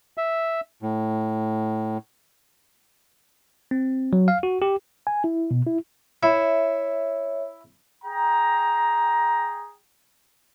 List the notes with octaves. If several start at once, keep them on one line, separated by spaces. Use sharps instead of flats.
E5
A2
C4
F#3
F5
F#4
G4
G#5
E4
B2
E4
E4 C#5 E5
G#4 G5 A#5